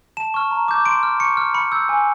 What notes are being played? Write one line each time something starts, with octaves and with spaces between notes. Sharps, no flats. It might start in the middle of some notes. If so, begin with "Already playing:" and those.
A5 E7
C#6 F6
A#5
D6 G6
C6 D7
F6
C#6 C#7
F6
B5 C#7
E6 G6
G#5